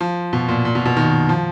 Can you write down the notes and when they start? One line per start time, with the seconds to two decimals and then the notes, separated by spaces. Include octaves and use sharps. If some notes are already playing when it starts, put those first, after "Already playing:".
0.01 F3
0.33 B2
0.48 A#2
0.65 A#2
0.75 B2
0.86 B2
0.97 D#3
1.29 F3